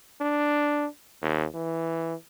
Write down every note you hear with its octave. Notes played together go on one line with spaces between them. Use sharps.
D4
D#2
E3